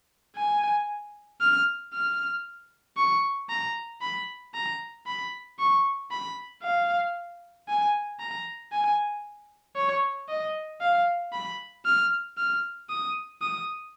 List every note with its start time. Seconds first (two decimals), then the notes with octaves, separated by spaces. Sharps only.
0.36 G#5
1.41 F6
1.93 F6
2.97 C#6
3.49 A#5
4.01 B5
4.54 A#5
5.06 B5
5.59 C#6
6.11 B5
6.63 F5
7.68 G#5
8.20 A#5
8.72 G#5
9.76 C#5
10.29 D#5
10.81 F5
11.33 B5
11.85 F6
12.37 F6
12.90 D#6
13.42 D#6